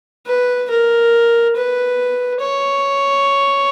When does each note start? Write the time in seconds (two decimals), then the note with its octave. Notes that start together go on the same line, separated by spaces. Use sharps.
0.26 B4
0.70 A#4
1.56 B4
2.40 C#5